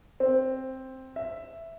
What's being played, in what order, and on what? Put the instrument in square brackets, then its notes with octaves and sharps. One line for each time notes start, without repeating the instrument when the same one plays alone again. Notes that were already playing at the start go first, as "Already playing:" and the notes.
[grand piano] C4
E5